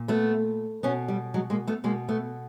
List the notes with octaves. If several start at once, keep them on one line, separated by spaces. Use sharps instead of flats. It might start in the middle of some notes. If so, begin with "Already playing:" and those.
Already playing: A#2
A3 B3
B2 B3 C#4
G3
F#3 G#3
G#3 A#3
A3 B3
B2 G#3 A#3
A3 B3